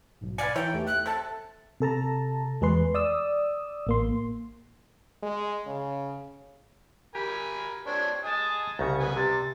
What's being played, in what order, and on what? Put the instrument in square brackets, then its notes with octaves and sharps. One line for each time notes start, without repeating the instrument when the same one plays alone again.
[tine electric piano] B1 G#2
[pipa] B4 F5 G#5 [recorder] D5 [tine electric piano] C#7
[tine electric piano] E3 [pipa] D#4 E4 C#5 [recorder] G5
[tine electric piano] E2 A3 G4
[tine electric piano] E5 [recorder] F#6
[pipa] C3 A5 [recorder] A4
[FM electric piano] C3 A4 A5 A#5
E2 G#3 G#4 B4 C6
D5 D#6 E6
A1 A#3 C6
[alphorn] G#3
C#3
[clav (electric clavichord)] G4 [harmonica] A#4 G#5 B5
[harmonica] C4 D4 C#5 [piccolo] G#6
[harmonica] D#5 G#5 [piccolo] A5
[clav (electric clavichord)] C2 C#3 [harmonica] A#5 [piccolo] C#6
[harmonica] B3 G#5
[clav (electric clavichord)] C3 [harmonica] G3 [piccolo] A6